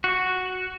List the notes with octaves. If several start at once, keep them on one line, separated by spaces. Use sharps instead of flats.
F#4